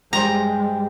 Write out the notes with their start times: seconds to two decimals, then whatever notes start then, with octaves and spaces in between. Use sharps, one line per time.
0.13 G2 G#3 G4 C5 G5 A#5